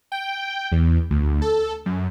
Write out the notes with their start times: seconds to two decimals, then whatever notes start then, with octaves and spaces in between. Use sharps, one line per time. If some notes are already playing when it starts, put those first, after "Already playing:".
0.12 G5
0.72 E2
1.11 D2
1.42 A4
1.86 F#2